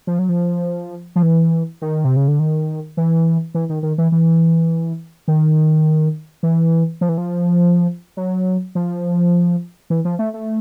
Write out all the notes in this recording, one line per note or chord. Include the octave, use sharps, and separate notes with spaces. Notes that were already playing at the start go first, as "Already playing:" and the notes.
F3
F#3
F3
F3
E3
D#3
C3
C#3
D3
D#3
E3
E3
D#3
D#3
E3
E3
D#3
E3
F3
E3
F3
F#3
F3
E3
F3
A3
A3